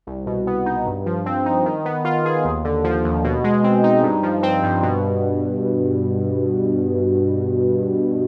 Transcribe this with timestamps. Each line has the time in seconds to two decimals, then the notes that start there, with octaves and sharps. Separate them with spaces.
0.07 C2
0.27 B2
0.47 B3
0.66 D#4
0.86 G2
1.06 F3
1.26 C4
1.46 D#4
1.65 D#3
1.85 B3
2.05 F4
2.25 G#4
2.45 D#2
2.65 D3
2.84 F3
3.04 D#2
3.24 B2
3.44 G#3
3.64 C4
3.84 D#4
4.03 G2
4.23 F3
4.43 C4
4.63 G2
4.83 B2